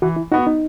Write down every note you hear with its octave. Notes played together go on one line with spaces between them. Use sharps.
E3 F#4
E4
B3 D#4 F#4
D#4